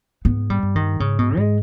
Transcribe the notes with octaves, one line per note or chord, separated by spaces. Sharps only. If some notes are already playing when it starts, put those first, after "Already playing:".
G#2 B3
G3
G2
D#3
G#2 C#3
B2
G#2 G#3